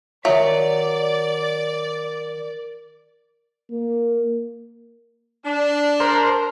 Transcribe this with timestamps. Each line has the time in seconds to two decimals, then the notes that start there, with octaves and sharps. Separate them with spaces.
0.25 D#3 F#3 A#4 D5 E5
3.70 A#3
5.45 D4
6.00 A#4 C5